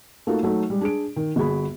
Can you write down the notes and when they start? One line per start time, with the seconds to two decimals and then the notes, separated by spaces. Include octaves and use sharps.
0.27 A3 A#3 D#4 F4 F#4 A4
0.43 F#3 A3 D#4 A4
0.70 G3 G#3
0.81 D4 G#4 D7
1.16 D#3
1.36 G1 F#4 G#4 B5